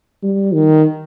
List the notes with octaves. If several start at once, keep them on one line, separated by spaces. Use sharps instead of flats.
G3
D#3